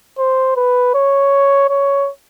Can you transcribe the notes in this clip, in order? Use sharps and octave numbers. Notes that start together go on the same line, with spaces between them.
C5
B4
C#5
C#5